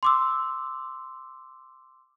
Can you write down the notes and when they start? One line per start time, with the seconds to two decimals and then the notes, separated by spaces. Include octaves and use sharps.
0.03 C6 D6 E6